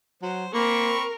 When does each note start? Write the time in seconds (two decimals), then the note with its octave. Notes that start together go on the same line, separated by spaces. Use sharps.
0.22 F#3 C5
0.54 A#3 C4 A#4 B5 C#6